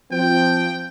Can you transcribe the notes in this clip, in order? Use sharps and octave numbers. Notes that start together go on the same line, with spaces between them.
F3 C4 G5